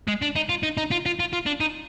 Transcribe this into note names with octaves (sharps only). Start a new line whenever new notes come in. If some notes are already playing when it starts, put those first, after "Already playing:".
G#3
D4
D#4
F4
D#4
D#4
F4
F4
F4
F4
D4
D#4